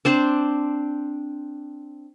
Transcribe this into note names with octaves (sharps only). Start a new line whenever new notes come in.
C4 D4 C5